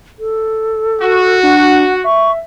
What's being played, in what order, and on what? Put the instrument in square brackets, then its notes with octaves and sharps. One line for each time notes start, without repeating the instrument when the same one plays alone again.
[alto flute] A4
[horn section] F#4
[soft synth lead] D4 [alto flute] F#5
[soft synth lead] E5 [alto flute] C#6